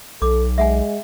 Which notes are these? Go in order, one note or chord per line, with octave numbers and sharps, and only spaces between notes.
B1 A4 D6
G#3 E5 F#5 G#5